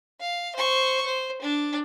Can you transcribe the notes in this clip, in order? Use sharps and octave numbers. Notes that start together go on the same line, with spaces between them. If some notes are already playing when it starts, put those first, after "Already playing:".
F5
C5 C#6
C5
D4